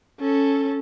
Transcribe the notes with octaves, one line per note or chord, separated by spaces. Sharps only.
C#4 A4